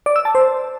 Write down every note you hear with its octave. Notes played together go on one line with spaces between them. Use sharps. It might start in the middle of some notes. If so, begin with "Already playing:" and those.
D5
E6
A5
C5